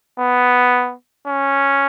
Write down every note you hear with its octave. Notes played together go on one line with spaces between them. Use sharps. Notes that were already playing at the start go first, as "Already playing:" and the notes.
B3
C#4